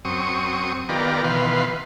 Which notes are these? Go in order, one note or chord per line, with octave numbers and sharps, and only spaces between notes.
F#2 C4 C#6 D#6
D#3 B3 F4 G4 A#4 D5
B2 D#3 E3 B4 F5 C6